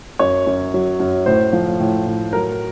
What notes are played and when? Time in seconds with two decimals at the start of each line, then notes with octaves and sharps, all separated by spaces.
0.19 F#2 C#5
0.47 F#2
0.74 F#3
1.00 F#2
1.26 A2 C5
1.53 F3
1.80 A2
2.07 A2
2.33 F#3 A#4